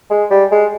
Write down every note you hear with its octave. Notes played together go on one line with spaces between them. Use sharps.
G#3
G3
G#3